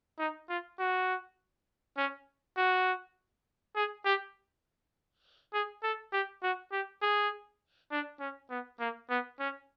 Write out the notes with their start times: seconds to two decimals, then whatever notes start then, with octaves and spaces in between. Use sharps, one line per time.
0.19 D#4
0.49 F4
0.79 F#4
1.97 C#4
2.57 F#4
3.76 G#4
4.05 G4
5.54 G#4
5.83 A4
6.12 G4
6.43 F#4
6.72 G4
7.02 G#4
7.92 D4
8.20 C#4
8.50 B3
8.80 A#3
9.10 B3
9.40 C#4